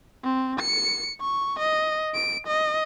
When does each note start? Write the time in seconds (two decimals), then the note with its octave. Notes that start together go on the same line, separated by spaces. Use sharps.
0.24 C4
0.60 C#7
1.21 C#6
1.59 D#5
2.15 D7
2.47 D#5